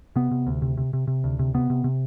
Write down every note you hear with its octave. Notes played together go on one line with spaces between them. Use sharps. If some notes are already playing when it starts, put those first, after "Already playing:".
C3 B3
C3
D2
C3
C3
C3
C3
D2
C3
C3 B3
C3
C3